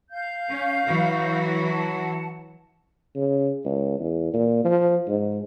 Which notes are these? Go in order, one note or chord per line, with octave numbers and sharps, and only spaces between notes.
F5 G6
C#4
E3 F#3 F#4
F#5 A5
C#3
C#2
E2
A#2
F3
G#2